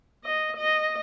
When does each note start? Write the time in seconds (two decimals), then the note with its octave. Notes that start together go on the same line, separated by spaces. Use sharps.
0.24 D#5
0.56 D#5